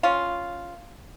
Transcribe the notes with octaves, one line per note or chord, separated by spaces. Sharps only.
C#4 F4